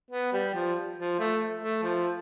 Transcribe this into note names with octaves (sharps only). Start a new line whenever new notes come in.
B3
G3
F3
F3
A3
A3
F3